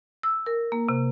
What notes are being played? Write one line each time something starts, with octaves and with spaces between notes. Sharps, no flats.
E6
A#4
A#3
C3